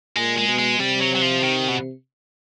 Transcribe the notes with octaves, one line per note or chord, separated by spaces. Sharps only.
A#2 G#3
G#3
B2
G#3
C3 G3
F#3
F#3
F3
D#3
B2